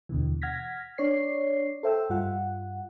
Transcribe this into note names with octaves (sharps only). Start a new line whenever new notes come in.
D#2 B2 D3 E3
F#5 F6 G#6 A#6 B6
D4 C#5 D5 C7
A4 C5 E5 G5 E6
G2 G3 F4 F#5